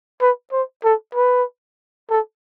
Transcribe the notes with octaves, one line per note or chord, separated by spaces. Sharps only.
B4
C5
A4
B4
A4